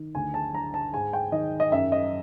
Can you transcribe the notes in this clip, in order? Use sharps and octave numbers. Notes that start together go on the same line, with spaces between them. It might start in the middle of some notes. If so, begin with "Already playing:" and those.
Already playing: D#3
D2 G#5
A5
D3 A#5
A5
G#2 G#5
G5
D#3 D#5
D#5
F#2 E5
D#5